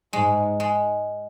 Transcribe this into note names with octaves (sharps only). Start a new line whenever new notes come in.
G#2 G#3
G#3